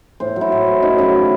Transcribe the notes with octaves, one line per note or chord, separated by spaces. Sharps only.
A2 C5
F#3
E4
A2
F#3
F#2 D#4
C#3 F#3 E4